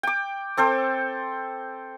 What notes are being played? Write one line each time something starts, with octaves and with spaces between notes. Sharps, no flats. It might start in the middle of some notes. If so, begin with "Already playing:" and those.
G5 D6
C4 A4 C5 G5